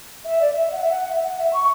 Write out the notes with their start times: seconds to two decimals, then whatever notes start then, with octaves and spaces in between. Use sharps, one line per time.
0.24 E5
0.41 D5
0.53 E5
0.67 E5
0.72 F#5
0.81 E5
0.91 F#5
1.10 E5
1.24 F#5
1.38 E5
1.53 C#6